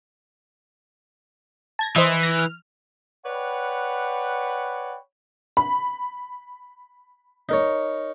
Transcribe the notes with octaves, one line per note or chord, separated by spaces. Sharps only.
A5 G#6 A#6
E3 C5 D#5 E5
A#6
F6
B4 C#5 D5 F#5 G5 B5
B5
D#4 A#4 C#5